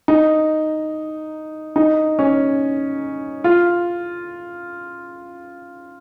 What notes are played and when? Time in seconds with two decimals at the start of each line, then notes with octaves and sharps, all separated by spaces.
0.08 D#4
1.76 D#4
2.19 C#4
3.44 F4